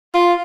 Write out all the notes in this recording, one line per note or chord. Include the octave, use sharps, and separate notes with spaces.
F4